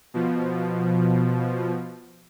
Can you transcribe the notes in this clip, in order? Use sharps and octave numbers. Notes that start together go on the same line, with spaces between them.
B2 F3